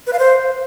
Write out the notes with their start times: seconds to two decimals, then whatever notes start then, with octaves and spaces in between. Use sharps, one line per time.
0.07 B4
0.13 F5
0.19 C5